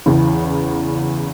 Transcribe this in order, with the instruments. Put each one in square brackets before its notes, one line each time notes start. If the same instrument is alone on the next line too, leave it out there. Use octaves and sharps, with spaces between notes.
[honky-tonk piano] E2 C#3 E3